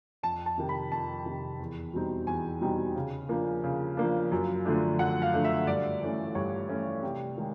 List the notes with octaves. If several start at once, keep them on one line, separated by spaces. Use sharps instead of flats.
F2 A5
A5
C3 D#3
B5
F2 A5
C3 D#3
E2
B2 G3 C4 D#4
E2 G#5
B2 G3 C4 D#4
C#3
F3 A#3 D4
C#3
F3 A#3 D4
F#2
D3 F3 A3 D4
F#2 F#5
F5
D3 F3 A3 D4
E5
G2 D5
E3 A3 C#4
G2 C#5
E3 A3 C#4
C3
D#3 G#3